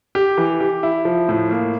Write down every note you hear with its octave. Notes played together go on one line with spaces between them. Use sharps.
G4
E3
G4
E4
F3
A2
A#3